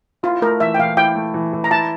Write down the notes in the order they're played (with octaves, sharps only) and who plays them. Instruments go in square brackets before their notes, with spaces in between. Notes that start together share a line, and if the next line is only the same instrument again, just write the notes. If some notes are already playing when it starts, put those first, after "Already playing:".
[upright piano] E4 [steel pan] F4
[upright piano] A3 [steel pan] A#4
[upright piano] E3 [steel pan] E5
[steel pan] G5
[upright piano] E3 [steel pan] F5
[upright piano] E4 [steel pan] G5
[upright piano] A3
E3
E3
[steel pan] A#5
[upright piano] E4 [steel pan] A5